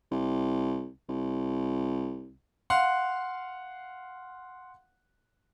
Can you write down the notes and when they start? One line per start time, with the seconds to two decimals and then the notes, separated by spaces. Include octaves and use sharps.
0.12 C2
1.09 C2
2.70 F5 F#5 C6